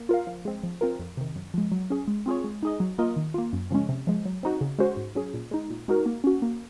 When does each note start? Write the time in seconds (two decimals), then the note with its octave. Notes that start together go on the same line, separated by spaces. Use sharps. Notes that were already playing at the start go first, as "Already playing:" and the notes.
Already playing: A#3
0.09 F4 A#4 F5
0.27 F3
0.45 G#3 C4
0.63 F3
0.81 C4 F4 A#4
0.99 F2
1.17 C3 D#3
1.36 F#2
1.54 F3 G#3
1.72 F#3
1.90 C#4 G#4
2.08 G#3
2.26 C4 F4 G#4 C#5
2.44 G#3
2.63 D#4 G#4 D#5
2.80 F#3
2.98 A#3 F4 A#4 D#5
3.16 D#3
3.34 A#3 F4
3.53 F#2
3.71 C#3 F3 G#3 C#4
3.89 C3
4.07 F3 G#3
4.25 F#3
4.43 C4 D#4 F#4
4.61 C#3
4.79 G#3 C#4 F#4 C5
4.97 G#2
5.15 F#3 C#4 G#4
5.34 A#2
5.51 G#3 D#4
5.70 A#2
5.88 G#3 D#4 F#4 A#4
6.06 A#3
6.24 C#4 F#4
6.42 A#3